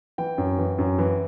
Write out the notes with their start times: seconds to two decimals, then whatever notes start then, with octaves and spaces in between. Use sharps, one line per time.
0.18 E3 G5
0.38 F#2
0.58 E3
0.78 F#2
0.99 E3